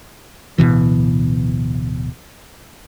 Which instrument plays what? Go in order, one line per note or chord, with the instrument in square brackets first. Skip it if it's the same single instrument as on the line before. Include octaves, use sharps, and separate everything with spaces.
[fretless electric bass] D1 C#2 B2 E3